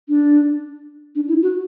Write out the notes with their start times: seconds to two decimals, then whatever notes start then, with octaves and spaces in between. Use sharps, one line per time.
0.08 D4
1.15 D4
1.28 E4
1.42 F#4